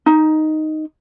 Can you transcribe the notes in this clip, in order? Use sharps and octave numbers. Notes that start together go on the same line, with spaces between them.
D#4